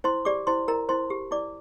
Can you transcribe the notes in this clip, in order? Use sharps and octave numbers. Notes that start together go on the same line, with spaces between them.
E4 C5 C6
G4 D5 D6
E4 C5 C6
E4 A#4 A#5
E4 C5 C6
G4
E4 D5 D6